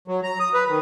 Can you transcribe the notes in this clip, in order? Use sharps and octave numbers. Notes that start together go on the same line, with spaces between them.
F#3
A#5
D#6
B4
D#3